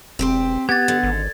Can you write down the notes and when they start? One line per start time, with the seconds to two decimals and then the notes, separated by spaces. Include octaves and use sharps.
0.19 E1 C4 G4 C5
0.69 B3 G4 G#6 A6
0.88 D3
1.03 G#1